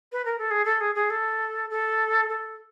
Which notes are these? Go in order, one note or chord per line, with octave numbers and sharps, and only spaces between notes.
B4
A#4
A4
G#4
A4
G#4
G#4
A4
A4
A4